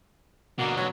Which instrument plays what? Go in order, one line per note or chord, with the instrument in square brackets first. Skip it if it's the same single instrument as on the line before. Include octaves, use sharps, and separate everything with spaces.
[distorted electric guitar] B2 D3 [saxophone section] A#3 F#4
[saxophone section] F#3